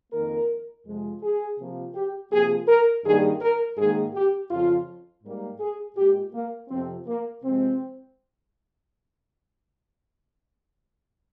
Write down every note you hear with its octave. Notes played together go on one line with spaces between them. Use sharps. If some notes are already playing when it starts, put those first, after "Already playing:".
F2 D#3 A#3 A#4
F2 C3 F3 G#3
G#4
C3 F3 A#3
G4
C3 F3 A#3 G#4
A#4
G2 D#3 G3 A#3 G#4
A#4
G#2 D#3 A#3 G#4
G4
F2 C#3 F3 F4
G#2 G3 A#3
G#4
A#2 G#3 G4
A#3
F2 C3 F3 C4
A#3
C3 F3 G#3 C4